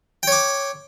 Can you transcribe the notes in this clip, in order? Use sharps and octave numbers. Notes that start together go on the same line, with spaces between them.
C#5 G5 D6